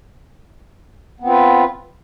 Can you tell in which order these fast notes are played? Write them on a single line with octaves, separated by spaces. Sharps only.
B3 C4 F4 B4